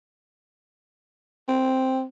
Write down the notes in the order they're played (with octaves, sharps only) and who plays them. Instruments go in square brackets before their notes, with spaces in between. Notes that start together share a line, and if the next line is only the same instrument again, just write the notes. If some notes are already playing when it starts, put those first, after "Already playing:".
[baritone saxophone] C4